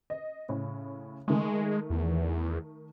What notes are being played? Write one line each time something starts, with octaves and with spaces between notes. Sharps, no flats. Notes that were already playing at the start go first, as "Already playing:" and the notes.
D#5
A2 C#3
D#3 G#3 A3
E2